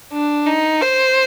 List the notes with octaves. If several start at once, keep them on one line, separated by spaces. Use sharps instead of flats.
D4
D#4
C5